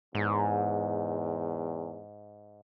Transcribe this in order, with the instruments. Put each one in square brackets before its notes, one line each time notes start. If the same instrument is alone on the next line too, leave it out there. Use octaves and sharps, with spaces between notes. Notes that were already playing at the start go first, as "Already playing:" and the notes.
[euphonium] E2 [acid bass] G#2